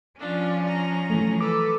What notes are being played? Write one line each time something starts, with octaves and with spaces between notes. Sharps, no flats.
F3 C#4 D4 F4
A#5
E3 F#3 A3
A4 B4 D6